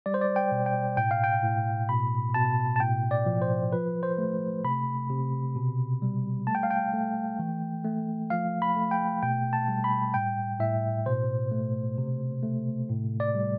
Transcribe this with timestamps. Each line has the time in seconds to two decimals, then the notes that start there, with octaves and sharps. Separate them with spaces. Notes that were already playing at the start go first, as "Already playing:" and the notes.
0.06 G3 D5
0.14 C5
0.21 D5
0.36 G5
0.52 B2
0.66 G5
0.97 A2 G5
1.11 F5
1.24 G5
1.43 A2
1.89 B2 B5
2.34 B2 A5
2.76 A5
2.80 A2 G5
3.11 D5
3.26 F3
3.42 C5
3.72 F3 B4
4.03 C5
4.18 A3
4.64 C3 B5
5.10 C3
5.56 B2
6.02 G3
6.47 A3 A5
6.55 G5
6.63 F5
6.70 G5
6.93 A3
7.39 E3
7.84 A3
8.30 F3 F5
8.62 B5
8.76 A3
8.91 G5
9.23 B2 G5
9.53 A5
9.68 G3
9.84 B5
10.14 A2 G5
10.59 A2 E5
11.06 B2 C5
11.51 A3
11.98 C3
12.43 A3
12.89 A2
13.20 D5
13.35 G3